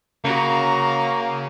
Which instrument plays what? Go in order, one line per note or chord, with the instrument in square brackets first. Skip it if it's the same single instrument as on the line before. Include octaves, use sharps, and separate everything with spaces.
[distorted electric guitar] C#3 [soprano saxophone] A#3 [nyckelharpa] F#4 A#5